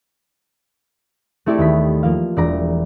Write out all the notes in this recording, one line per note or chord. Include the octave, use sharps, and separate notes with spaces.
A3 C4 E4 G4 A4 D5
D#2 B3 B6
F3 A#3 F5
E1 D5 A#5